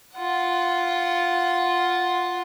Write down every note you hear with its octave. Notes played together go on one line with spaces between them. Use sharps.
F4 F#5